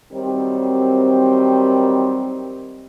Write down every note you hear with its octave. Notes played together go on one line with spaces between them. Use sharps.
D#3 F#3 G3 C4